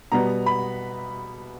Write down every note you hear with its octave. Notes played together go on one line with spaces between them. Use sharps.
B2 G3 B3 A#5
B5